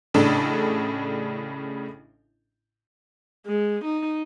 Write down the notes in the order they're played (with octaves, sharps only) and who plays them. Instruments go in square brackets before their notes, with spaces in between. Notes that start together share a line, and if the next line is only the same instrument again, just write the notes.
[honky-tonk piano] A1 A2 C#3 D4 A4
[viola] G#3
D#4